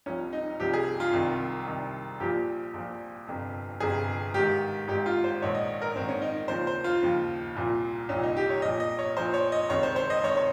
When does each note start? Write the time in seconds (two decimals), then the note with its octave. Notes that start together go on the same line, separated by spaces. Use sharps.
0.06 C2 C3 F3 C#4
0.33 D#4
0.59 C2 C3 F3 G4
0.74 G#4
1.00 F4
1.13 C2 C3 D#3
1.67 C2 C3 D#3
2.20 A#1 A#2 F3 G4
2.74 A#1 A#2 F3
3.27 G1 F2 C3
3.80 G1 F2 C3 G#4
4.34 G#1 G#2 D#3 G4
4.88 G#1 G#2 D#3 G4
5.06 F4
5.24 C5
5.42 A#1 G#2 D#3 C#5
5.55 D#5
5.82 A#4
5.95 A#1 G#2 D#3 C4
6.08 C#4
6.22 D#4
6.48 D#2 C#3 F3 C5
6.67 C5
6.84 F4
7.02 D#2 C#3 F3
7.55 C2 A#2 F3
8.09 C2 A#2 F3 C#4
8.23 D#4
8.37 G4
8.50 C#5
8.62 A#1 A#2 F3 D#5
8.80 D#5
8.99 C#5
9.17 A#1 A#2 F3 C5
9.34 C#5
9.52 D#5
9.69 C#2 C3 D#3 C#5
9.83 C5
9.96 C5
10.10 D#5
10.23 C3 D#3 C#5
10.37 C#5